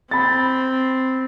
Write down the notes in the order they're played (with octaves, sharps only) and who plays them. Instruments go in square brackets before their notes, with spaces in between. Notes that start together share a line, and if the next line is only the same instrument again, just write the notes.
[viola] C4 [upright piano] B5 A6